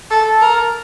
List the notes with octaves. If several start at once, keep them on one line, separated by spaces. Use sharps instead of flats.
A4
A#4